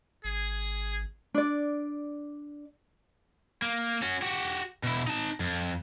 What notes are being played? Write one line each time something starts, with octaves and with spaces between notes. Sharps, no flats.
G#1 G#4
D4 D5
A#3
C#4 F#4
F#4 G4
B2 E4
D#4 A5
F2